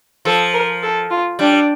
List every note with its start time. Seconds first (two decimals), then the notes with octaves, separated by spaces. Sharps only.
0.25 F3 A4
0.53 A#4
0.82 A4
1.10 F4
1.39 G3 D4